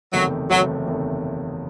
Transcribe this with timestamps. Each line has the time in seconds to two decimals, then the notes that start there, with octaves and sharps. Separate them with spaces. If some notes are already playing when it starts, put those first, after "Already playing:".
0.13 F#1 E2 C3 D#3 F#3 A3
0.50 F#1 E2 C3 D#3 F#3 A3
0.86 F#1 E2 C3 D#3 A3